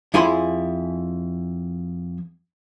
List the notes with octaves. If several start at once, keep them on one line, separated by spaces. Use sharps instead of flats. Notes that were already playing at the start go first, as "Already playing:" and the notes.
F2 E4 G#4 G#5 B5 C6